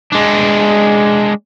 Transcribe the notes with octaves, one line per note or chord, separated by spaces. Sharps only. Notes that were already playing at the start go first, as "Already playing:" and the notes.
G#3 D4